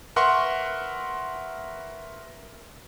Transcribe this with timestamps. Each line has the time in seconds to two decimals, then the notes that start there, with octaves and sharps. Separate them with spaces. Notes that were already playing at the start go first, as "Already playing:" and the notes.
0.16 A#4 B4 E5 F#5 C6 C#6